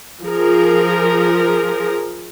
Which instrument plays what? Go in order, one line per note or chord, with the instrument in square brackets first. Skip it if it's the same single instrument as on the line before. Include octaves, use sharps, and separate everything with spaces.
[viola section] F3 G#4 A#4